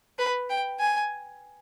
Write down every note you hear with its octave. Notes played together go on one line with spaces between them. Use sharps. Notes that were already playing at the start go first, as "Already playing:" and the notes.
B4
G5
G#5